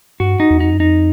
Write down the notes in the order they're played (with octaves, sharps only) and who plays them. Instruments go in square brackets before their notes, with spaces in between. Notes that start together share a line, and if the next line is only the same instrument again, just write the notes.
[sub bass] G2 [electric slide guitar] F#4
[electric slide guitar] D#4
[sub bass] E2
[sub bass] F2 [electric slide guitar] D#4
[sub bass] F#2
[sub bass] F2 [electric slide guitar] D#4